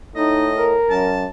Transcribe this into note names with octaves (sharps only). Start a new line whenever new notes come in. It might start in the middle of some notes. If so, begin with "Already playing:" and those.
A2 D#4 D#5
A#4
F#2 A5